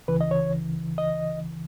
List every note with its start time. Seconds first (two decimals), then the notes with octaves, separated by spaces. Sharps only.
0.08 C#2 C#3 E3 B4
0.21 D#5
0.31 C#5
0.98 D#5